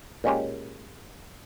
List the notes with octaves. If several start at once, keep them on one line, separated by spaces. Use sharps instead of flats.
A#2 G#3 C#4 G4